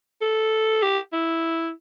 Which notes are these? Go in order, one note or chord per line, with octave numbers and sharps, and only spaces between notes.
A4
G4
E4